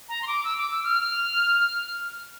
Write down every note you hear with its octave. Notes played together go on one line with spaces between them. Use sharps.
A#5
C6
D6
E6
D6
E6
F6